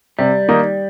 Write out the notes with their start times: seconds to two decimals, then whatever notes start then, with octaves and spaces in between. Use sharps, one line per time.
0.19 C3 G3
0.48 D#3 A#3 D#4